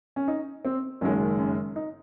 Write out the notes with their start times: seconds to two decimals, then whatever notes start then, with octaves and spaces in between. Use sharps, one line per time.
0.16 C#4
0.28 D#4
0.65 C4
1.01 F#1 F#2 D#3 G#3 C#4
1.38 C#4
1.76 D#4